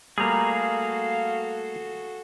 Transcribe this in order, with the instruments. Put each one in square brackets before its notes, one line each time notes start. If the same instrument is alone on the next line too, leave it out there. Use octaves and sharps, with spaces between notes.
[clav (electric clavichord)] G3 A3 A#3 [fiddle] F#4 A4 [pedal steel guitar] G#4 A#5 [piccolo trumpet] F5